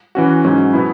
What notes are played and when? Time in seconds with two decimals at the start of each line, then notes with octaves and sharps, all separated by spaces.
0.15 E3 C#4 F#4
0.44 G#2 F#3 C#4
0.73 B2 B3 E4